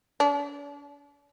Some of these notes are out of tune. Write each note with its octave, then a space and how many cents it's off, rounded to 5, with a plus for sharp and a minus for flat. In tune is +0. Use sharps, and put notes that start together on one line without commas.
D4 -45